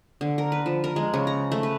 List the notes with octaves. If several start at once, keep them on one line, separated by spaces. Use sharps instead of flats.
D3
A#4
B4
F3
A#4
G#3
C#3
A#5
A3
B4